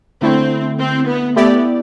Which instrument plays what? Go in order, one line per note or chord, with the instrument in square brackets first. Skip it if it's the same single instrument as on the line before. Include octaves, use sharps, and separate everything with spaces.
[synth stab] D3 A3 E4 [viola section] C4
[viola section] C4
B3
[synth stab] A3 E4 G4 D5 [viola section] B3